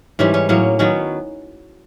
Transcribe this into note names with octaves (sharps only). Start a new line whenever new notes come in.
G#2 E3 G3 C#4
C#4
A2 F#3 A#3 C#4
D#3 F#3 B3 C#4